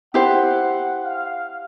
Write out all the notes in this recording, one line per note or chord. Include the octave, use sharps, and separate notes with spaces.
E4 G4 C5 F#5
F5